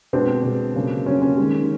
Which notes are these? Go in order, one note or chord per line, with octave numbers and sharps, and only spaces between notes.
B2 G#3 C4 D4
B2 G#3
C#3 F#3 A#3
C#3 F#3 A#3 C#4
C#4
D#3 G#3